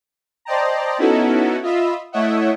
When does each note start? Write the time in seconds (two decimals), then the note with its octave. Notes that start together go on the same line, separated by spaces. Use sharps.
0.45 C5 D5 D#5 G5 A5 A#5
0.98 B3 C#4 D#4 E4 F#4 A4
1.62 F4 D#5 E5 B5 E6
2.12 A3 E4 C#5 D#5 E5 F#5